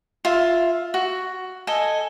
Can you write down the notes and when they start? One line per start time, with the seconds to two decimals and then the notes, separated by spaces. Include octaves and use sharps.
0.25 F4 E5
0.94 F#4
1.67 A4 D#5 G#5